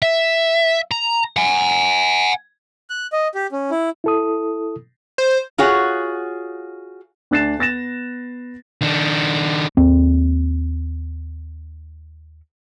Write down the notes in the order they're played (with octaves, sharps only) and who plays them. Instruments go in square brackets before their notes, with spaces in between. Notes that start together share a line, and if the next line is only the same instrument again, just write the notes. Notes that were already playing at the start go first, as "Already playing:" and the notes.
[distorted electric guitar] E5
A#5
F#5 G#5
[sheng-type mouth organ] F#6
D#5
G4
C#4
E4
[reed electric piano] E4 A4 D#6
[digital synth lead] C5
[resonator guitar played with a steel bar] F4 F#4 G#4 C#5 F#5
[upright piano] D2 D4 F#6 A6 C7 E7
B3 A6 A#6 E7
[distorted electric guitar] D#3 D4
[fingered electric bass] D#2 C4